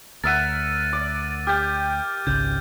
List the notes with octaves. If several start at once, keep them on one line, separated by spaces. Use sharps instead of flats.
D2 A#4 E5 F#5 A6 D#7
D5
G4 F6 G6
G#1 C#2 C#3 G6